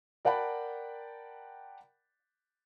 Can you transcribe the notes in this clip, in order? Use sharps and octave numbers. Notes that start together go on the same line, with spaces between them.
A#4 D5 F#5 G5 A5 B5